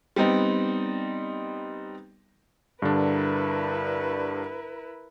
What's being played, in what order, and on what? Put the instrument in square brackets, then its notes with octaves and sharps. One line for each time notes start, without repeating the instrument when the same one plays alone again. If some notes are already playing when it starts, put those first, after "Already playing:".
[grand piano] G3 B3 C4 D#4
[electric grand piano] G2 D3 D4 [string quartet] E4 A#4 B4